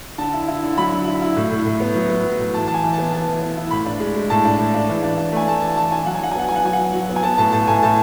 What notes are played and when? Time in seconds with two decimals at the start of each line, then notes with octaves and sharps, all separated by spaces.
0.18 D3 A5
0.33 E4
0.48 E4
0.63 D3
0.77 F#3 B5
0.92 D3
1.07 E4
1.22 E4
1.36 A2
1.51 A2
1.66 A2
1.80 B3
1.95 F#3
2.10 B3
2.24 F#3
2.40 A2
2.54 E3 A5
2.67 E3 A5
2.74 G#5
2.84 E3
2.93 B3 A5
3.12 E3 A5
3.28 E3
3.41 B3
3.57 E4
3.71 A2 B5
3.86 D4
4.00 G#3
4.16 G#3
4.30 A2 A5
4.45 D4
4.60 A2
4.74 D4
4.89 E3
5.03 D4
5.18 D4
5.32 A3 G#5
5.47 A3 A5
5.62 E3 A5
5.76 E3 A5
5.91 D4 G#5
6.06 F#3 F#5
6.14 G#5
6.21 F#3 F#5
6.31 G#5
6.35 B3 F#5
6.48 F#3 G#5
6.56 F#5
6.65 F#3 G#5
6.73 F#5
6.79 F#3
6.94 F#3
7.09 B3
7.16 G#5
7.23 B3 A5
7.38 A2 A5
7.52 A2 A5
7.67 A2 G#5
7.83 A2 A5